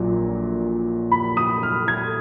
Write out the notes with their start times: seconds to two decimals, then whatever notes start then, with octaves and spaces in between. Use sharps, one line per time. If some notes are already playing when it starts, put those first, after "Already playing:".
Already playing: A#1 A#2 F#3
1.12 B5
1.37 D#6
1.63 F6
1.88 G#6